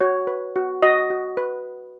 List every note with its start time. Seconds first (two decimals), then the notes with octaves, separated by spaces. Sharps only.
0.01 F#4 C#5
0.27 B4
0.56 F#4
0.82 F#4 D#5
1.10 F#4
1.37 B4